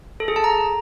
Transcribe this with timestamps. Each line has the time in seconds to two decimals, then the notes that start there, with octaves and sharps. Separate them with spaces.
0.20 A4
0.28 G#4
0.36 A5
0.44 A#5